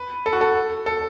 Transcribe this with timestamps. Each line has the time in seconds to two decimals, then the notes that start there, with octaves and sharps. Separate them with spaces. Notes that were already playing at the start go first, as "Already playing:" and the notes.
Already playing: B4
0.26 A4
0.33 F#4
0.41 A4
0.86 A4